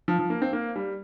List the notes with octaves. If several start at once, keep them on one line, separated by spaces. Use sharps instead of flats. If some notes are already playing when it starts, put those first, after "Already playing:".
F3
F3
A#3
C4
A#3
G3